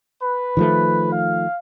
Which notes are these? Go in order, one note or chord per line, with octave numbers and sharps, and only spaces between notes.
B4
D#3 F3 A3
F5